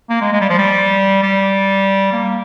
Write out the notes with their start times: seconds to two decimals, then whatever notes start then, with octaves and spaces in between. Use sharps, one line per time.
0.09 A#3
0.21 G#3
0.32 G#3
0.40 G3
0.50 F3
0.58 G3
1.23 G3
2.13 A#3